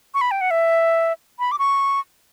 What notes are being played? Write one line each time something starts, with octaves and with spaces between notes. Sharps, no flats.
C#6
B5
G5
F#5
E5
B5
D6
C#6